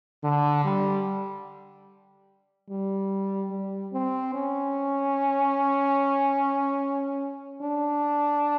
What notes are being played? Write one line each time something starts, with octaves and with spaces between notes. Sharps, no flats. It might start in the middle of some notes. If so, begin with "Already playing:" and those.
D3
G3
G3
G3
C4
C#4
D4